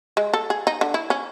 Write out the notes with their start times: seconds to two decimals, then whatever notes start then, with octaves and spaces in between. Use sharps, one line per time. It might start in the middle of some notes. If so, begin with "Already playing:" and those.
0.17 G#3
0.34 A4
0.50 G#4
0.67 D#4
0.81 D3
0.94 E4
1.10 C#4